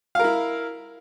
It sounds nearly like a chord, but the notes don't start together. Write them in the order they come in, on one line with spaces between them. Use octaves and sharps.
F5 A#4 E4